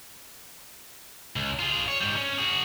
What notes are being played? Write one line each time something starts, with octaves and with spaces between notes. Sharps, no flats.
C#2
F4 G#4
C#5
G#2 G3
C#4
F#4 G#4